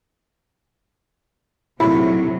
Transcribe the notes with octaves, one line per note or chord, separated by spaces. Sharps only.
A#1 D#2 A2 C3 F#3 E4 B5